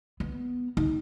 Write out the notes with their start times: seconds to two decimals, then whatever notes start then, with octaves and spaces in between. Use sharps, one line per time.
0.20 B3
0.77 D#4